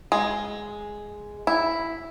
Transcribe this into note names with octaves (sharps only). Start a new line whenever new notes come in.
G#3
E4